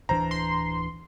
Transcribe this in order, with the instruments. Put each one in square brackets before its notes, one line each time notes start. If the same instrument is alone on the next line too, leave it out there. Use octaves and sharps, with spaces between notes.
[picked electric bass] D1 E3 D4 [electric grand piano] C5 A#5
[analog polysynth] C6